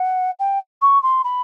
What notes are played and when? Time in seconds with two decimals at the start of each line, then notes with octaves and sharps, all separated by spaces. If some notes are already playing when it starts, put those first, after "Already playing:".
Already playing: F#5
0.39 G5
0.82 C#6
1.03 C6
1.24 B5